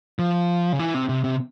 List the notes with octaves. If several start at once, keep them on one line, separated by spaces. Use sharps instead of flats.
F3
C#3
E3
C3
C3
C3